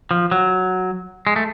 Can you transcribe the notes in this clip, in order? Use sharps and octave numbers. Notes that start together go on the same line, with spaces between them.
F3
F#3
G#3
A3